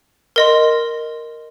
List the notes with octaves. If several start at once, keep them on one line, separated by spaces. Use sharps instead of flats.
A#4 D#5 C6